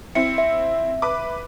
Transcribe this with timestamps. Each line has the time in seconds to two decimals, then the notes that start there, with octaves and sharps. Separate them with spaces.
0.15 C4 E4 C#7
0.38 E5
1.02 B4 D6